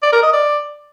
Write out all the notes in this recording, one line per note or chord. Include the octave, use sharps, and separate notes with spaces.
D5
A#4
D#5
D5